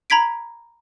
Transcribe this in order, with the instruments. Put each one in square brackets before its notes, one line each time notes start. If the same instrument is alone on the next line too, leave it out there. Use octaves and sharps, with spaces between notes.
[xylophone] A#5 B5 G#6 B6 D7